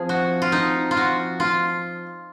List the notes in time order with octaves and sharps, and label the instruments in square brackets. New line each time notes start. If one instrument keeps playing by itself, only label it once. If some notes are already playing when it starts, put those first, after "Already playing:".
Already playing: [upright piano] F3 C4 [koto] G#4
[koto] F#4
F4
D#4
F4
F#4
F4